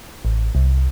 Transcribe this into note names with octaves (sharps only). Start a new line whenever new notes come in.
A1
C2